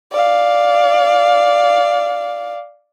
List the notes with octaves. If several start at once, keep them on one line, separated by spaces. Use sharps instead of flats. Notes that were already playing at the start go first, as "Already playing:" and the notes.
D5 F5